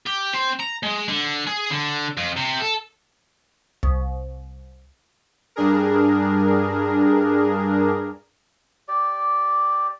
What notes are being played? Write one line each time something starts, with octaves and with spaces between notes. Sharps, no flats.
G4
C4
A#5
G#3
D3
G#4
D3
F2
C3
A4
C2
G2 D4 G#4 A#4
G4 D5